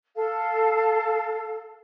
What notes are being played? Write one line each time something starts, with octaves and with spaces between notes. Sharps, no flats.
A4 F5